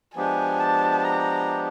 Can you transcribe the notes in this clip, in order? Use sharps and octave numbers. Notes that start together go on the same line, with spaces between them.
F3 G#3 B3 D4 G4 G#5
A5
A#5